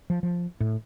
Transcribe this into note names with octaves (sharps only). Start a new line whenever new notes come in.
F3
F3
A2